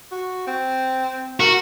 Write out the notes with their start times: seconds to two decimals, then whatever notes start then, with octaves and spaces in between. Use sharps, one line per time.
0.11 F#4
0.47 C4
1.40 F#4 A#4